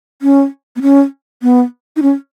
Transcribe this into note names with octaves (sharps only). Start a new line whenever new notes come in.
C#4
B3
C#4
B3
D#4
C#4